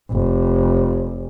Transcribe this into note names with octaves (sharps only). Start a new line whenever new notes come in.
F1